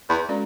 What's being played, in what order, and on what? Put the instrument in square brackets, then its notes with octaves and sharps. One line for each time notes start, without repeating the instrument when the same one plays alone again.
[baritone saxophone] E2
[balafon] G#3 C#4 F#4 A4 D5